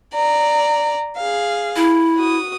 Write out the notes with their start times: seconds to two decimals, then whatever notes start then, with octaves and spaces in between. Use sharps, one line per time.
0.14 D5 A#5
1.17 G#4 F5
1.76 E4
2.16 F#4 D#6